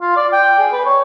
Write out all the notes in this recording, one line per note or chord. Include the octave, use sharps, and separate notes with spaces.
F4
D5
G5
G#4
B4
C#5